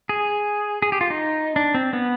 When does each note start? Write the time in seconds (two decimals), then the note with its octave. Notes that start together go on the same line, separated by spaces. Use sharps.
0.09 G#4
0.82 G#4
0.92 G4
1.01 F4
1.10 D#4
1.56 D4
1.74 C4
1.93 B3